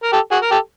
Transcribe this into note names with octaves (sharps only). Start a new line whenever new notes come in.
A#4
G4 A4
F#4 G#4
A#4
G4 A4